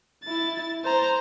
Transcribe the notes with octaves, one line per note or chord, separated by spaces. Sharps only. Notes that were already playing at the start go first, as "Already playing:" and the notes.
E4 A6
C5 A#5